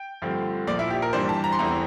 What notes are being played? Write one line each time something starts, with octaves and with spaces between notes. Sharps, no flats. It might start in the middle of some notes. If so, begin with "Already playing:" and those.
Already playing: G5
G2 D3 F3 A3 C4
A#1 A#2 F3 D5
E4
G4
A#4
G2 E3 G3 D4 C5
A5
A#5
C6
E2 E3 A3 C4 A#5